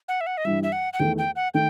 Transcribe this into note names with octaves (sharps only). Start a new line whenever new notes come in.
F#5
E5
F#5
D#5
G2 E3 G3 E5
E5
F#5
F#5
E2 D#3 A3 G5
G5
F#5
D#3 A3 G5